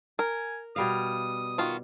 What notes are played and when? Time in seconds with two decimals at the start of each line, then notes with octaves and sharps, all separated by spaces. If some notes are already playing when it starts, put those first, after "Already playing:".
0.19 A#4 G#5
0.76 B2 G3 F5 D#6
1.58 D#3 F4 F#4